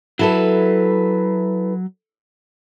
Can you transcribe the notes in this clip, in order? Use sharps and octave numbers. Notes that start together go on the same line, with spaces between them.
F#3 E4 A4 B4